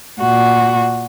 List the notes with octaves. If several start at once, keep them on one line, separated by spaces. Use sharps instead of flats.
A#2 F#4